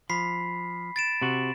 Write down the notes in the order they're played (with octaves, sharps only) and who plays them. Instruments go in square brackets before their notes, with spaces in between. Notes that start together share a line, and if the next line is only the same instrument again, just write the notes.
[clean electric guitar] F3 [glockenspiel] B5 B6 C7
[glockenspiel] A6 D7 E7
[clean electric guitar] C3 F#4